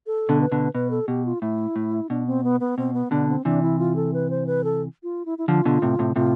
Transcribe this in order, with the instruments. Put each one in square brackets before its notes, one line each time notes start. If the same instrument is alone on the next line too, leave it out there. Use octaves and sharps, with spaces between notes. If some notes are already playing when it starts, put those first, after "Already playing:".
[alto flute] A4
[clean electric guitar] B2 D3
[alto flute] B4
[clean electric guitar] B2 D3
[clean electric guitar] B2 [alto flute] B4
[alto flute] A4
[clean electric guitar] B2 [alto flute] G4
[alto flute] F4
[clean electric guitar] A2 [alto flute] E4
[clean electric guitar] A2
[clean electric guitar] B2 [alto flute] D4
[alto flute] C4
B3
B3
[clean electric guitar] B2 [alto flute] C4
[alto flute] B3
[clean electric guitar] B2 D3 [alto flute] D4
[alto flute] C4
[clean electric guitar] C3 E3 [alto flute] D4
[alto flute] E4
F4
A4
B4
C5
B4
A4
F4
E4
E4
[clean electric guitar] D3 F3 [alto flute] F4
[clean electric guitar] B2 D3
A2 C3
A2 C3
[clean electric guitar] A2 C3 [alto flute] F4